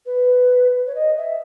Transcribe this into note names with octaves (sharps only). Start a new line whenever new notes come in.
B4
C#5
D#5
E5